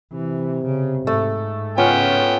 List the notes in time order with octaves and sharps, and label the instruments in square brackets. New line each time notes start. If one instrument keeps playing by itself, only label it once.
[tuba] C3 [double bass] E3
[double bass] C#3
[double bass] G#2 [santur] A3
[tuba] C#3 [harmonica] B3 G5 [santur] C#4 F4 F#5